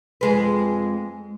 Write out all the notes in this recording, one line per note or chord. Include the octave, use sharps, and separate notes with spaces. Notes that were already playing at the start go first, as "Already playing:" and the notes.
F2 G#3 B4